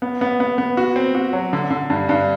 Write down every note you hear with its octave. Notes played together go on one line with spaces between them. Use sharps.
B3
B3
B3
B3
F#4
C4
F#4
F#3
D3
D3
G2
G2